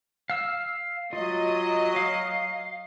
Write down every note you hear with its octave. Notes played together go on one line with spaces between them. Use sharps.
F5 E6
F#3 F4 D#5
F5